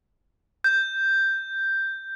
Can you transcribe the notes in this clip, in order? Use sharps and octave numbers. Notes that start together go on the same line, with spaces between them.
G6